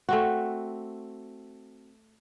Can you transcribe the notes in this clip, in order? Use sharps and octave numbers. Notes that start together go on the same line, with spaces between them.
A3 C4 F#4